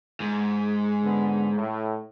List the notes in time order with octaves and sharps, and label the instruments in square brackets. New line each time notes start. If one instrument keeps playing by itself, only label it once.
[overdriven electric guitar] G#2
[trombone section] D3 B3
A2